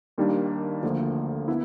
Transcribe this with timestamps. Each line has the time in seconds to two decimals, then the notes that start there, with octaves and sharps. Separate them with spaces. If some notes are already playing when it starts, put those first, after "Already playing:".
0.18 D#2 D#3 G3 A#3 D4
0.83 D2 D3 F3 A#3
1.48 B3 E4